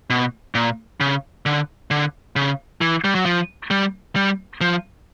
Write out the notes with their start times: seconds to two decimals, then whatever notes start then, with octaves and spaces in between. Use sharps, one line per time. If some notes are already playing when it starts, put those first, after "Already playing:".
0.10 B2
0.55 A#2
1.00 C#3
1.46 D3
1.91 D3
2.36 C#3
2.81 E3
3.04 G3
3.15 F#3
3.26 F3
3.71 G3
4.16 G3
4.61 F3